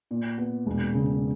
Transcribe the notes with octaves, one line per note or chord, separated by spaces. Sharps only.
A#2
B3
E1
C#3